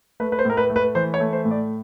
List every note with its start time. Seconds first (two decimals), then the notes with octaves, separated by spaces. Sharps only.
0.20 A3 B4
0.32 B4
0.39 C5
0.45 A2 A#4
0.57 B4
0.70 A3
0.76 B4
0.95 E3 C5
1.14 C#5
1.20 A3
1.33 C5
1.45 A2
1.51 D5